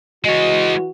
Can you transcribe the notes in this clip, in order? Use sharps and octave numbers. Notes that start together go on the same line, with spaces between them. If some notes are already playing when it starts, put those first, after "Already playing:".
E3 G#3 F#4 C#5 D#5